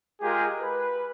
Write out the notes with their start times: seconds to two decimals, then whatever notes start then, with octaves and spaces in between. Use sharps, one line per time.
0.21 G#3 F4 G4 G#4 A#4
0.61 B4